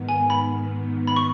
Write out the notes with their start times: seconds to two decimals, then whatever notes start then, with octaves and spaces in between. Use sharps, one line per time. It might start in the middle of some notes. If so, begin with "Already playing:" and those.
Already playing: G#2 D#3 B3
0.09 G#5
0.30 B5
1.07 B5
1.16 C#6